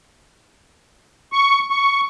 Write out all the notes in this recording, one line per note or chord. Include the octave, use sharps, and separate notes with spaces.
C#6
C#6